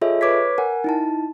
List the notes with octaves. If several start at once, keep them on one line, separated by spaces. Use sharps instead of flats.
F4 G#4 A4 C#5 D#5 E5
B4 C#5 D6 G#6 B6
A#4 F#5 G#5
D#4 E4 A5